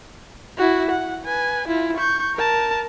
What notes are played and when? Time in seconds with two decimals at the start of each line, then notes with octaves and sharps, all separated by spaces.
0.57 E4 F#4
0.91 F#5
1.25 B4 G#5
1.68 E4 F4
1.97 C#6 G6
2.36 A#4 A5